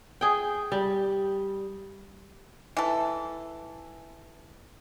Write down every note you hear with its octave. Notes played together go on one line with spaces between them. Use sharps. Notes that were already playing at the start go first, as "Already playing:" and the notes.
G#4 G5
G3
E3 A4